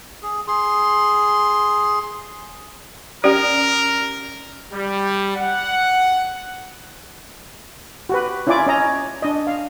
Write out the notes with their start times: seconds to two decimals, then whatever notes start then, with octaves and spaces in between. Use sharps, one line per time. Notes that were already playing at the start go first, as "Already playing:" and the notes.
0.23 G#4
0.48 G#4 C6
3.24 C#4 G4 A#4 D5
4.72 G3
5.37 F#5
8.09 F#4 G4 B4
8.47 C#4 E4 F4 D5 G#5 D6
8.67 C#4 D#5 A#5
9.22 D4 D#5
9.47 F5